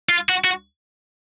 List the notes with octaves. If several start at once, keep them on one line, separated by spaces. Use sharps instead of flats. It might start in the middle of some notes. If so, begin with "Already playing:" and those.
F4
F#4
F#4